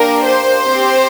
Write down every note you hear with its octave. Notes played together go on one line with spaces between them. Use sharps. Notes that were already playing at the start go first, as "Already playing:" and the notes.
Already playing: A#3 D4 G4 A#4
C5
C4 G4